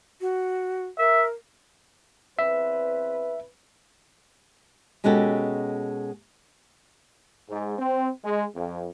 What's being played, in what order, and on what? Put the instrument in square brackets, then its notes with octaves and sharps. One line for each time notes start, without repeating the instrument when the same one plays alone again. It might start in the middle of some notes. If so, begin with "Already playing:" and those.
[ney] F#4
[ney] A#4 [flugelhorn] E5
[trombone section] E2 C4 B4 [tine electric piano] E5
[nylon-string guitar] B2 G#3 C#4 F#4 G4 A4
[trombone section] G#2
C4
G#3
F2